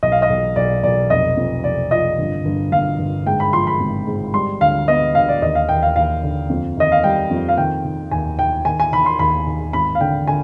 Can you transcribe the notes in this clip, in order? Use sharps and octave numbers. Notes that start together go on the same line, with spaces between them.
B1 D#5
F5
D#5
B1
B1 D5
B1 D5
F1 D#5
F2
F1 D5
F3 D#5
G1
G1
G1 F5
G1
G#2 G5
B5
F3 C6
B5
G#1
G#2
G3 C6
D2 F5
B3 D#5
D2 F5
D5
D#2 D#5
F5
D#2 G5
F5
D#2 F5
D3
F2
D#3 D#5
F5
G3 G5
F2
F5
D#3 G5
D#3
D#2 G#5
D#3 G5
D#3 G#5
G#5
D#3 B5
C6
D#2 B5
D#3
G#1 B5
F5
D3 G5
D3 G#5